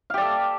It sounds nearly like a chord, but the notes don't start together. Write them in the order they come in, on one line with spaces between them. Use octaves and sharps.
F5 G4 D5 A4